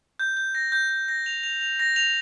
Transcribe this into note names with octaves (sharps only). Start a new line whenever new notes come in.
G6
G6
A#6
G6
G6
A#6
F7
F7
F7
A#6
F7